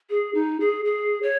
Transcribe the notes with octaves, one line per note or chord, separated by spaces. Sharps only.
G#4
D#4
G#4
G#4
C#5